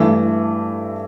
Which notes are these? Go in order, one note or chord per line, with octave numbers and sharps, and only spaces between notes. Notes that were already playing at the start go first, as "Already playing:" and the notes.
Already playing: G2 E3 A3